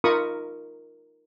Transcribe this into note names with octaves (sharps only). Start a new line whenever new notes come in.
D#4 F4 A#4 B5 C#6 D#6